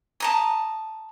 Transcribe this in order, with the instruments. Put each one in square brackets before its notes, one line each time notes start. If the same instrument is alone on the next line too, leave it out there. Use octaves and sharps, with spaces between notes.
[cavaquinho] A5 A#5 D#6